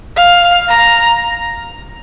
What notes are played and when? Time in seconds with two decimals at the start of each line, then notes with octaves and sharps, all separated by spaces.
0.16 F5
0.69 A#5